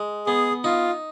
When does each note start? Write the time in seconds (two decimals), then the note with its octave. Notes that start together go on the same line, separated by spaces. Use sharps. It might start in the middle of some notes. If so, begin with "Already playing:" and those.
Already playing: G#3
0.27 B3 G#4
0.64 D#4 F4